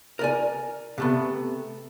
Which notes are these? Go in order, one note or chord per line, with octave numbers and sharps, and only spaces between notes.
A#4 D5 G#5
C3 A3 B3